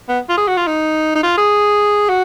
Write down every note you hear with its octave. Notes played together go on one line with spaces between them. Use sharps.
B3
F4
G#4
F#4
F4
D#4
D#4
F4
G#4
F#4